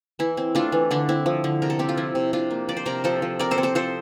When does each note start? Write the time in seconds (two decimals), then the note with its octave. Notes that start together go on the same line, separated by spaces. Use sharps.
0.19 E3 E4
0.37 C4
0.55 A3 D4 F4
0.72 E3
0.91 D3 D4
1.09 C4 E4
1.26 F3
1.44 D3
1.62 C3 A#4
1.70 A4
1.79 C4 G4
1.89 F4
1.97 F3 E4
2.15 C3
2.33 C3 D4 F4
2.51 A#3
2.69 F3 D5
2.77 C5
2.86 C3 A#4 D5
3.04 F3 A4 C5
3.22 F3
3.39 C4 A#4 D5
3.51 A4 C5
3.58 C4
3.63 A4 C5
3.75 F3 A4 C5